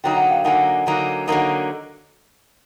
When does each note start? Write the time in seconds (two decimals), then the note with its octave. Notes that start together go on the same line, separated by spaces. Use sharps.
0.04 D3 F#3 A#3 D#4 G5
0.17 F#5
0.30 F5 G5
0.45 D3 F#3 A#3 D#4 F#5 G#5
0.87 D3 F#3 A#3 D#4
1.28 D3 F#3 A#3 D#4